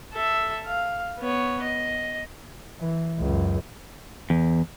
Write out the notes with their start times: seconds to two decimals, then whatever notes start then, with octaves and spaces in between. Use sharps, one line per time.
0.13 A4 E5
0.66 F5
1.19 B3 C#5
1.63 D#5
2.80 E3
3.19 C#2 F#2
4.30 E2